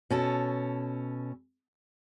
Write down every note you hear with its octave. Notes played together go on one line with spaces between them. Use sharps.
B2 C#4 A4